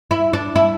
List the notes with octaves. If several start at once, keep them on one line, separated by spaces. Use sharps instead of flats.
E4
D4
E4